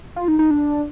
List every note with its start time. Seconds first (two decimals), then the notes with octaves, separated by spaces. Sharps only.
0.16 F4
0.28 D#4
0.39 D#4
0.51 D4